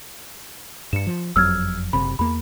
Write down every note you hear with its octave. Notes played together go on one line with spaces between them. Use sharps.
G2 C#7 E7
F3
F#1 F2 F#3 E6 F6 G#6
F#1 C3 B5
E2 A#3 B5